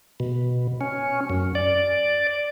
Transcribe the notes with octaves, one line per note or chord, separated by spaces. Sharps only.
B2
C#4
F#2
D5